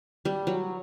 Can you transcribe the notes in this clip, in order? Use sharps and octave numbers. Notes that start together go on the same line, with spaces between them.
G3
F#3